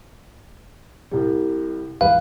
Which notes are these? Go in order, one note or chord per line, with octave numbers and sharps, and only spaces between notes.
C2 G3
G1 E2 G#2 B4 F5